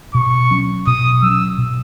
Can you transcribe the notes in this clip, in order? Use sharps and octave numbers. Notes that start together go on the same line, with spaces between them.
B2 C#6
F#3 C#4
B2 D#6
F#3 C#4 E6
B2